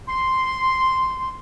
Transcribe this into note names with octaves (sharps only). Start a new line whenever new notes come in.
C6